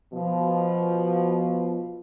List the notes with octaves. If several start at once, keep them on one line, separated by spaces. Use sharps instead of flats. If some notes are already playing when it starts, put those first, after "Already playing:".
B2 F3